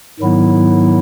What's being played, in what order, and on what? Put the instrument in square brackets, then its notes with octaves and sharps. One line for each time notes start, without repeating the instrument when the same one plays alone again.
[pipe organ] G#2 D#3 F#3 B3 E4